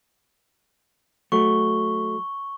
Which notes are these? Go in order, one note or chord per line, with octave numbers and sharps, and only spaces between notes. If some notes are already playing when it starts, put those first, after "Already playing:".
F#3 A3 C#6 G7